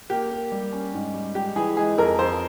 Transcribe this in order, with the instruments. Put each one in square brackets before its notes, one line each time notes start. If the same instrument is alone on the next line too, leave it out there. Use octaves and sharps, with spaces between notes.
[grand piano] A#3 [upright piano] G4
[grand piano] A#3
G3
C#4
G#2
G3
[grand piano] G#3 [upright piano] G4
[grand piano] E3 [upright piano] G#4
[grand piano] G#3 [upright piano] G#4
[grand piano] F2 [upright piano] A#4
[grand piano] F2 [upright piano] C5